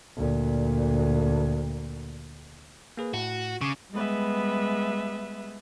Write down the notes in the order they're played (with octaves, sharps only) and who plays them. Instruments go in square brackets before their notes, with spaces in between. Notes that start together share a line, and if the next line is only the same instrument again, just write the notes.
[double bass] D2 A#2
[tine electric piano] A#3 G#4 B4
[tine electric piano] A2 [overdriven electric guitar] F#4
[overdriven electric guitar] C#3 [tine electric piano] C#6 D6
[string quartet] G3 G#3 B3 B4 E5